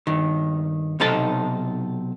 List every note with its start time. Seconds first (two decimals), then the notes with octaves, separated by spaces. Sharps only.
0.07 G2 D#3
1.00 B1 C3 D#4 A4 A5